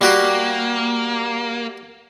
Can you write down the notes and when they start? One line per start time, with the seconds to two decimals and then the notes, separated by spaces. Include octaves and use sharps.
0.01 G3 A#3 F#4 G4